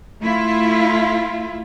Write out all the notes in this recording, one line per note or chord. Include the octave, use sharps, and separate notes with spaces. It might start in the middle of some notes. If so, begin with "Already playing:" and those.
A3 E4 F4